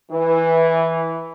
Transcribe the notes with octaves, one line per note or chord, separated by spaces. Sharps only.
E3